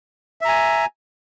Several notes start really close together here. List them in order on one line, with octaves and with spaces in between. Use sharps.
E5 A#5 G#5